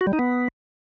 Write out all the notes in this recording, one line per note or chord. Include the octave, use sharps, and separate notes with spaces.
F#4
G3
D#4
B3